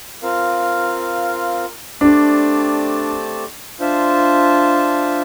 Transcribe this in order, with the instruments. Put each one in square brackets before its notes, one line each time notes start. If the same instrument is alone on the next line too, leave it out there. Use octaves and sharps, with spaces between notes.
[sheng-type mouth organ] C4 F4 A#4 F5
[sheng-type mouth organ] A3 C4 G4 D5 A5 [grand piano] D4
[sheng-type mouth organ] D4 F4 C5 E5 A5